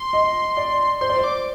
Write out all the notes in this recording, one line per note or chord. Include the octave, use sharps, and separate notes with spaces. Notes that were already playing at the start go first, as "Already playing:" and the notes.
Already playing: C6
D#5
D5
C5 C6
D5
C5
D6